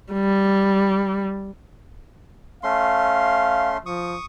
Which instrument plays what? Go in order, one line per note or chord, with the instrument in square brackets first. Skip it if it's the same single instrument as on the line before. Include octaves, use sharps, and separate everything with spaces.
[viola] G3
[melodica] A3 C#4 C6 [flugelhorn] F5
[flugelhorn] F3 [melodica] C#6 D#6